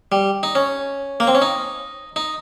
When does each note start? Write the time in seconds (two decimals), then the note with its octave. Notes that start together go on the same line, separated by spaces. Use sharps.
0.12 G3
0.43 D#4
0.55 C#4
1.20 A#3
1.27 C4
1.35 C#4
1.42 D#4
2.16 D#4